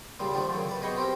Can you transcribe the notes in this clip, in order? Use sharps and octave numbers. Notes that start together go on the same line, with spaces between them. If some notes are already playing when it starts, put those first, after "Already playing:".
A#2 C#3 G3
D3 D#3 F3 A3 D4
F#2 C#3
B4 D5
B2 G#4 D#5 G5 C#6
C4 G4 A#4